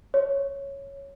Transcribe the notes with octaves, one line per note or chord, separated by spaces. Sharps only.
C#5